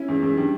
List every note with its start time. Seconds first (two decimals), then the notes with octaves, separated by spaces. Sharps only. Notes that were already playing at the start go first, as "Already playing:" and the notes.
Already playing: C#4 E4
0.08 E2
0.22 E2
0.37 G3 D4